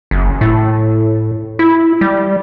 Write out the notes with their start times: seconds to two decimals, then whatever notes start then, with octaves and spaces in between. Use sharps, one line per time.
0.11 F#1
0.41 A2
1.59 E4
2.01 G3